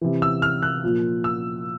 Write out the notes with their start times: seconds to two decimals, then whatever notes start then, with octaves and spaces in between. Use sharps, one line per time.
0.01 C3 E3
0.22 E6
0.42 F6
0.62 F#6
0.84 A#2 F3
1.24 E6